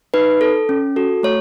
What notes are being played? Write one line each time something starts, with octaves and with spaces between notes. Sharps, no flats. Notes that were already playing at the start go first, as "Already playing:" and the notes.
D#4 B4
A4
C#4
F#4 A4
A3 C#5